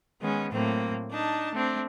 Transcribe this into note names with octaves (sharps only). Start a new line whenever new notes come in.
D#3 G#3 B3 C#4
A2 F#3 A3 A#3 C4
D4 D#4 A5
A3 C4 D4